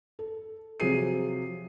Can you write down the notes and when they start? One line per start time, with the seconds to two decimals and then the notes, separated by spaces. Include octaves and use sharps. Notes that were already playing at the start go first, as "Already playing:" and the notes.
0.19 A4
0.80 C3 F3 F#3 G#4 C7 D#7